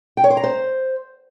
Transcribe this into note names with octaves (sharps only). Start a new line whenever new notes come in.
G5
C#5
C5
A#5
C5